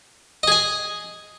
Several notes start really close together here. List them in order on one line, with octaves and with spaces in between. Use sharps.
D#5 G#4 G#5